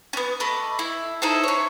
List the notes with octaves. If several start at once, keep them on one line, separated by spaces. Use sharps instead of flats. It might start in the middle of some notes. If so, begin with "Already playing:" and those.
B3 C#4
A3 D#5 B5 D6
E4
D#4 E4 A4 C5
C#4 C#5